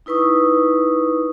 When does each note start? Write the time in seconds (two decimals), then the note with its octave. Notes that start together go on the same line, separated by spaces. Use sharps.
0.06 D#4 E4 B4 C#6 D#6